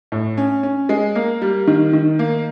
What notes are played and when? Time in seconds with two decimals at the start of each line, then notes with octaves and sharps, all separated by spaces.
0.12 A2
0.37 C#4
0.63 C#4
0.89 G#3
1.15 A#3
1.42 G3
1.67 D#3
1.93 D#3
2.19 A#3